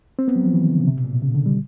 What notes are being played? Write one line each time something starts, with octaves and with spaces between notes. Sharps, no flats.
C4
B3
F#3
F3
E3
D#3
D3
C#3
C3
B2
A#2
B2
C#3
D3
G3